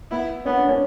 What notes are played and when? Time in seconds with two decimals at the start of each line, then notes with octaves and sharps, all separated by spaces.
0.11 B3 E4
0.45 B3 C#4
0.57 D4
0.69 C#4